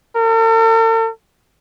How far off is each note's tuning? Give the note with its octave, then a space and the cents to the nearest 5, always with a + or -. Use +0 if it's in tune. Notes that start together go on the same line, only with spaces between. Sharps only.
A4 +45